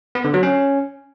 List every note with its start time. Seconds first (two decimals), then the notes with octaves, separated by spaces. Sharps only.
0.15 B3
0.24 D3
0.34 F#3
0.43 C#4